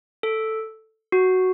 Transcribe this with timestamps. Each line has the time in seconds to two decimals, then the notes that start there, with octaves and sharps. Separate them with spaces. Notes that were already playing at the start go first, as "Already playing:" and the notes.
0.23 A4
1.12 F#4